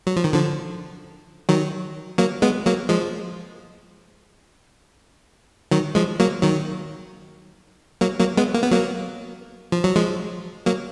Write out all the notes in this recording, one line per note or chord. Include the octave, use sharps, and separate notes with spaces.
F#3
F3
D#3
D3 F3
D#3 F#3
F#3 A#3
G#3 B3
F#3 A#3
F3 G#3
D#3 F#3
F3 G#3
F#3 A#3
D#3 F#3
F#3 A#3
F#3 A#3
G#3 B3
A#3
B3
F#3 A#3
F3
F#3
F3 G#3
F#3 A#3